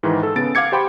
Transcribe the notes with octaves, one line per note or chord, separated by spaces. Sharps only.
G#2 D#3 E3
A4 E6
C#3 B3 A6 D7
F5 F#5 D6 G#6 C#7
G4 C5 G5 B5 D6